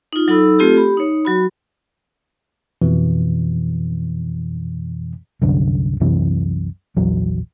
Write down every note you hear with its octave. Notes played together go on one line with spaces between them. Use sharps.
D#4 F4
F#3 D#4 A4 B5 E6
A3 C4 F4 G4 A4
G4 B5
D#4 C#5
F#3 F#4 B5
F2 B2 E3
C2 F#2 D3
C2 F#2 C3 E3
A#1 E2 F#3